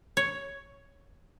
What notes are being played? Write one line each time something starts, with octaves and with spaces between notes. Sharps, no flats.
C#5